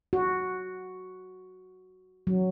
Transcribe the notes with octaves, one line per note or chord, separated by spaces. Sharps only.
F#4
F#3